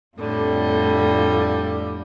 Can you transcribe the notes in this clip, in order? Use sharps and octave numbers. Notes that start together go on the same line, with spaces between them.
F2 A2 D3 G3